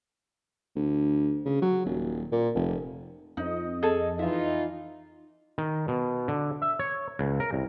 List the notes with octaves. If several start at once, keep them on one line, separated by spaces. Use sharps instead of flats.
D2
C#3
F#3
D#1
A#2
F1
F2 D#4 D#5
G#4 A4
E3 D#4 F4 E5
D#3
B2
D3
E5
C#5
C#2
A#4
C2